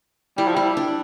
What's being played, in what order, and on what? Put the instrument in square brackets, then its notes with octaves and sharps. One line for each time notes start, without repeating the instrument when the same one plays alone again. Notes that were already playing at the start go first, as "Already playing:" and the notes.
[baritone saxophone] G3 [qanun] E4
[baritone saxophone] F3
[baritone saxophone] G3 [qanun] E4
[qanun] D4